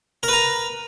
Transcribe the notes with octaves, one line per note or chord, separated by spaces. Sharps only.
A#4 B4 A#5